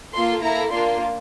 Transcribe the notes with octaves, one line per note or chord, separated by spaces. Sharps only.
A#3 F4 A4 C6
A#3 E4 A4 A#5
A#3 D4 F4 C6